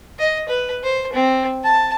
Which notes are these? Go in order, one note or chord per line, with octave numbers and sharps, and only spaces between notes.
D#5
B4
C5
C4
A5